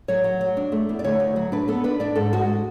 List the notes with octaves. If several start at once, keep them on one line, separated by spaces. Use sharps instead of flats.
F#3 C#5
F#3
F#3
D4
A3
E2
D5
D2 C#5
D2
F#3
D4 B4
B3 A4
D4 B4
D4 D5
G#2 A4
G#3 F#4